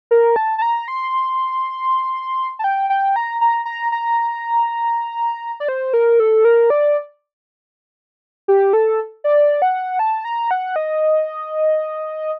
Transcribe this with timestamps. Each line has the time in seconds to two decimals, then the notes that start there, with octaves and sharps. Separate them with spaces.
0.11 A#4
0.36 A5
0.58 A5
0.62 A#5
0.88 C6
2.59 A5
2.64 G5
2.90 G5
3.16 A#5
3.41 A#5
3.65 A#5
3.92 A#5
5.60 D5
5.68 C5
5.94 A#4
6.20 A4
6.45 A#4
6.70 D5
8.48 G4
8.73 A4
9.24 D5
9.62 F#5
9.99 A5
10.25 A#5
10.51 F#5
10.76 D#5